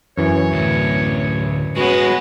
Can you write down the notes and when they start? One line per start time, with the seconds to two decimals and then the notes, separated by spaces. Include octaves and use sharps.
0.18 F#2 E3 C#5 G#5
0.53 D2 A2
1.76 G#3 B3 C#4 F#4